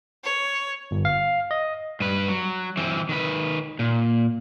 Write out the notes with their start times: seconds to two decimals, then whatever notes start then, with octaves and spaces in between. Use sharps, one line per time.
0.24 C#5
0.91 G1
1.05 F5
1.51 D#5
2.00 G2 B4
2.28 F#3
2.77 E3 C4
3.09 D#3 B4
3.79 A#2